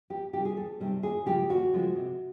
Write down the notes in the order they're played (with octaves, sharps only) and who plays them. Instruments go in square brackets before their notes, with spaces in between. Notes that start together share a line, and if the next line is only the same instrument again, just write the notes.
[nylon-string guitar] E2 G4
C3 D#3 G3 G4
G#4
E2 A4
C3 D#3 G3
D#2 G#4
C#3 F3 G#3 G4
D#2 F#4
C#3 F3 G#3
C3